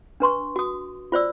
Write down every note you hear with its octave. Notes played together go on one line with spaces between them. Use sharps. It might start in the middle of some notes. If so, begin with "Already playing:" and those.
D4 B4 C6 C#6
F#4 D#6
F4 C5 D5 E6